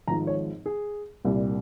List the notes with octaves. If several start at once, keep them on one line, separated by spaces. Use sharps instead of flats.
G#1 G#2 F3 A#5
C#5
G#4
C2 A#2 G3